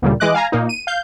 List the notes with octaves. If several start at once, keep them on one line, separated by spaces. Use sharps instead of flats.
D2 A#2 C#3 G3
E3 G#3 D#5 D6 F#6
F5 G#5 A#5
A#2 A#3 D#4
D#7
F5 G6